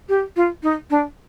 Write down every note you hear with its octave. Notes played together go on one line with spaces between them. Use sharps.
G4
F4
D#4
D4